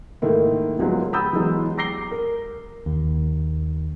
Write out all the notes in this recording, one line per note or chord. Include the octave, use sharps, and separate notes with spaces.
G#2 D#3 A3 A#3 E4
C#2 F3 F#3 G#3 B3
A#5 B5 D#6 E6 G6 A6
E3 F#3 G#3 B3
A#5 D6 A#6 C7 G7
A#4
D#2